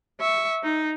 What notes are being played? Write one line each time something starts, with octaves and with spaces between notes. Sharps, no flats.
E5 C#6
D#4